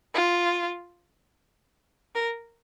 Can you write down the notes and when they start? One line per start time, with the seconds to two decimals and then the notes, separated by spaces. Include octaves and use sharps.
0.15 F4
2.15 A#4